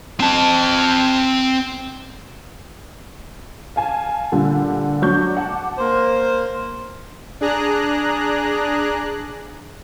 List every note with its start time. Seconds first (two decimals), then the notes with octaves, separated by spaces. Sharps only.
0.20 C4 A5
3.76 F5 G#5 A5
4.32 A#2 D3 G3
5.02 F#3 D4 C#6 G6
5.37 F#5 A5 D6
5.78 A#3 C5
7.41 D4 G#4 A#5 F#6